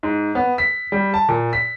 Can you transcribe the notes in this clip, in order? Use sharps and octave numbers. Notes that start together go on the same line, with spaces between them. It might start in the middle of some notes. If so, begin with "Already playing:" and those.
G#2
B3
B6
G3
A5
A#2
B6